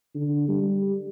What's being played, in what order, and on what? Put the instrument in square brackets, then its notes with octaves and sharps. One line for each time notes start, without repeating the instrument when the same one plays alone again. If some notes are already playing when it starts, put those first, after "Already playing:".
[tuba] D3
G3